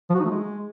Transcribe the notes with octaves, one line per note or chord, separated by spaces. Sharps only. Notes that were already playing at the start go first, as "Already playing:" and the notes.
F3
F#4
D#4
A3
G#3